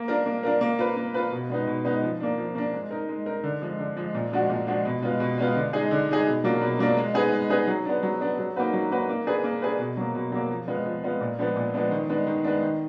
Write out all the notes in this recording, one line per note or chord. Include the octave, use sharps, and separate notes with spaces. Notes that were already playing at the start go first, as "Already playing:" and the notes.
Already playing: A#3
D4 F4 A#4
A#3
D4 F4 A#4
A#3
F4 B4
A#3
F4 B4
B2
G#3 B3 D#4
B2
G#3 B3 D#4
F3
A#3 D4
F3
A#3 D4
G#3
D#4 A#4
G#3
D#4 A#4
D3
F3 G#3
D3
F3 G#3
A#2
F3 G#3 D4 F#4
A#2
F3 G#3 D4 F#4
B2
G#3 B3 F4
B2
G#3 B3 F4
D3
G#3 D#4 G#4
D3
G#3 D#4 G#4
B2
F#3 A#3 D4 F4
B2
F#3 A#3 D4 F4
G#3
B3 D#4 G#4 B4
G#3
B3 D#4 G#4 B4
F#3
B3 D4
F#3
B3 D4
F#3
A#3 D#4 F#4 B4
F#3
A#3 D#4 F#4 B4
A#3
D4 G#4 B4
A#3
D4 G#4 B4
B2
F#3 A#3
B2
F#3 A#3
F3
G#3 B3 F4
F3
G#3 B3 F4
A#2
F3 G#3 B3 D4
A#2
F3 G#3 B3 D4
D#3
G#3 B3 D4
D#3
G#3 B3 D4
D#3